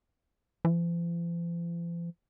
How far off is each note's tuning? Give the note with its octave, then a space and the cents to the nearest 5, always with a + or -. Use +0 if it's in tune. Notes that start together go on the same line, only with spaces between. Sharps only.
F3 -45